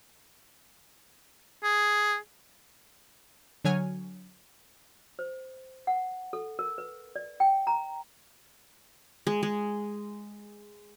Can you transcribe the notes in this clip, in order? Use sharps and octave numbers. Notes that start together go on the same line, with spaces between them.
G#4
D3 F#3 C#5 G#5 F6
C5
F#5
A4
A#4
B4
D5
G5
A#5
G#3
G#3